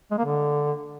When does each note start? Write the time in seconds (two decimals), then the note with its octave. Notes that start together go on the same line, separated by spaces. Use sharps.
0.11 G#3
0.18 A#3
0.25 D3